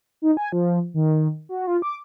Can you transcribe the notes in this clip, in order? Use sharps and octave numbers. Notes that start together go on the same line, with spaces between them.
D#4
G#5
F3
D#3
F#4
F4
D6